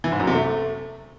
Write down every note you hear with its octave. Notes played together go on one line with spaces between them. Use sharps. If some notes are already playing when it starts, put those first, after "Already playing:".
E3
G#2
F#2
C3
A3